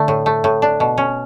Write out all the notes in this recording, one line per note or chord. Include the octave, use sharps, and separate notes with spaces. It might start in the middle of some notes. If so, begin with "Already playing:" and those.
Already playing: D3 A3
A2
A3
A2
D4
B2
C#4